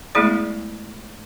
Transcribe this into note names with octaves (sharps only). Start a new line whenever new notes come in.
G#3 A3 B3 E4 G#4 D5